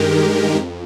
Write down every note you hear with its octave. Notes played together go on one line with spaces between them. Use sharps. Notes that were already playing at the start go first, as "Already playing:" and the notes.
Already playing: G2 D#3 G#3 G4 A#4
F2